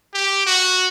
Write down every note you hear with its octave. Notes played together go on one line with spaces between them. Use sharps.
G4
F#4